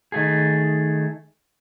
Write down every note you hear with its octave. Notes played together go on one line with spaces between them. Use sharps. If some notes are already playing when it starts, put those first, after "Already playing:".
D#3 A3 G#4